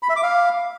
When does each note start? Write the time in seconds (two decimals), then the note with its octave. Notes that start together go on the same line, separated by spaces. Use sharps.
0.03 B5
0.09 E5
0.16 D6
0.23 F5